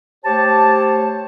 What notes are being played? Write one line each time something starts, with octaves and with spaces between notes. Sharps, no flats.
A3 G4 C5 C#5 A5